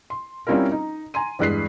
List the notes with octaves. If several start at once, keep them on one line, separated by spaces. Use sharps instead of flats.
C6
G3 C4 C#4 E4 F4 A#4
D#4
G#5 A#5 C6 D#7
E2 G2 G#3 F#6 B6 C7